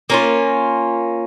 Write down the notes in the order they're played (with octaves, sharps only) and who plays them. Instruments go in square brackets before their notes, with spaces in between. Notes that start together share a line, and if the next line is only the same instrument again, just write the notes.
[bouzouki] A#3 C#4 F4